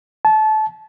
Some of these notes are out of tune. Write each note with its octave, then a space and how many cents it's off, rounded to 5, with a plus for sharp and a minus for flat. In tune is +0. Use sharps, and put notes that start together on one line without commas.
A5 -25